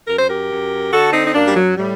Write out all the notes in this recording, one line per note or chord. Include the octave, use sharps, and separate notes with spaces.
F#2 A#4
C5
G4 A#4
F#2
D3 F#4 A4
C4 D#4
D#4
F#2 A#3 D4
G3
F#3
A2 G3